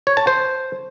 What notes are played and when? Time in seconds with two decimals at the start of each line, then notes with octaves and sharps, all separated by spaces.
0.07 C#5
0.17 A5
0.27 C5